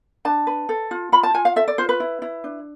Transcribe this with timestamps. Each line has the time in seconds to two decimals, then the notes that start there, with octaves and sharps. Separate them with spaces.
0.25 D4 A5
0.47 B4
0.69 A4
0.91 F4
1.12 F4 B5
1.23 A5
1.34 F4 G#5
1.45 F5
1.56 A4 E5
1.68 D5
1.78 F4 C5
1.89 B4
2.00 E4
2.22 E4
2.44 D4